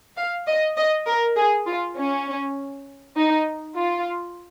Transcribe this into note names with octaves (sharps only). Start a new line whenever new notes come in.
F5
D#5
D#5
A#4
G#4
F4
C#4
D#4
F4